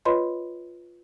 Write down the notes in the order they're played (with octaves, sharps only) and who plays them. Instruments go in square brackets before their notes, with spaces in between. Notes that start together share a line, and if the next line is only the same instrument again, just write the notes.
[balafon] F4 B4 C#5 D#5 B5 C6